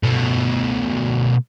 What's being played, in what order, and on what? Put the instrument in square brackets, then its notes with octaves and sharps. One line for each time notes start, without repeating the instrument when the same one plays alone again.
[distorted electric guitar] B2 A3